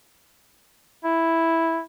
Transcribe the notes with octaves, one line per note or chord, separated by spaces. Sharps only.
E4